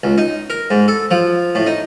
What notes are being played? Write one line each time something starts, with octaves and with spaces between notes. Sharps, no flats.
C#2
D#4
A#4
G#2
A4
F3
A2
D#4